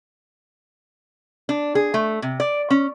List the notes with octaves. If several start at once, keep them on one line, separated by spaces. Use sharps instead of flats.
D4
G#4
A3
C3
D5
C#4